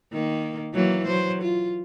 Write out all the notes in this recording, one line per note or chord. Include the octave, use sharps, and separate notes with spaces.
D#3 A#3
E3 F#3 A#3
F#3 C5
F4